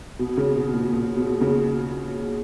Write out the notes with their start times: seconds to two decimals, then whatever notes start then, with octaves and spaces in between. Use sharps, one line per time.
0.19 B2
0.37 C#3
0.56 B2
0.74 A#2
0.92 A#2
1.17 B2
1.41 C#3